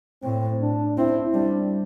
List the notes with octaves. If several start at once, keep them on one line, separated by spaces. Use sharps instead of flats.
A2 C4
D4
C4 E4
G3 D4